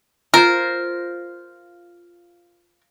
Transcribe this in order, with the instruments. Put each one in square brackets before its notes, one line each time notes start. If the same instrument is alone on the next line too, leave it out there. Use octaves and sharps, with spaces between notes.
[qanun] F4 C5 [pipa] A#4